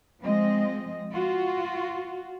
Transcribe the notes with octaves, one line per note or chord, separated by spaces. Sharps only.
F3 G#3 C4 D#5
F4 F#4